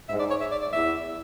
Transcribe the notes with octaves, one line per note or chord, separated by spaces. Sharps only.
G#2 E5
D5
C#5
E5
D5
D5
E2 E5